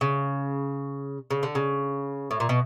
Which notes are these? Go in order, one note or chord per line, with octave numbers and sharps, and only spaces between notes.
C#3
C#3
D3
C#3
A2
A#2
B2